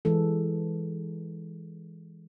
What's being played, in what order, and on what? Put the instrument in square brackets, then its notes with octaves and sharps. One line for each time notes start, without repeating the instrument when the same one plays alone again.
[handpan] E3 G#3 A4